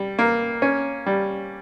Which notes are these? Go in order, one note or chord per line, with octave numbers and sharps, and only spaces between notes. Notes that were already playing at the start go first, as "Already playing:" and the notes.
Already playing: G3
A#3
C#4
G3